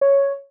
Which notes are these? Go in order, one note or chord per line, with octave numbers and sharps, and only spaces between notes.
C#5